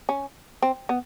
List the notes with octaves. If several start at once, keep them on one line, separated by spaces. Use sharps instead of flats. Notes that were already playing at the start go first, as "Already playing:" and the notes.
C#4
C4
B3